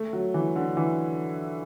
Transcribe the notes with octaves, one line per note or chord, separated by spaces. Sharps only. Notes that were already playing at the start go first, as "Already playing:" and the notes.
Already playing: A3
F#3
E3
D3
E3